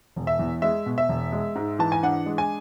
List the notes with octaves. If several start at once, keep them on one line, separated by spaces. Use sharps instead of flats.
E1
E5
E2
G#3 E5
B2
E5
E1
G#3
G#2
E3 A5
G#5
D4 F#5
G#3
G#5